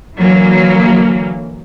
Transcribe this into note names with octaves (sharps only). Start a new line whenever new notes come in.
D3 E3 F#3 A#3